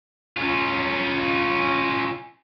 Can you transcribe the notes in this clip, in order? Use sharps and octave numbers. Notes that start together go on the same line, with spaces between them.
C#4 F4